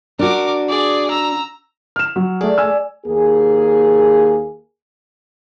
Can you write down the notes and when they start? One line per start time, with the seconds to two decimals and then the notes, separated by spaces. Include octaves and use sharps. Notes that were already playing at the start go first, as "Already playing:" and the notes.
0.19 D4 F#4 A#4 D6
0.69 G#4 D5
1.11 A#5 E6
1.96 F6 E7
2.16 F#3
2.41 A3 G#4 D5
2.58 G#5 E6
3.06 D#2 A#3 G#4